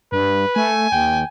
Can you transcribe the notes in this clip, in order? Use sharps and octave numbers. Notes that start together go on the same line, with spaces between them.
G2 B4
A3 G#5
D#2 G5